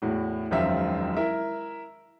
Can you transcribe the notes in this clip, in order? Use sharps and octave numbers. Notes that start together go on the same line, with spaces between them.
E2 A2 F#4
E1 F#2 D#3 F3 F4 E5
E4 A#4 E5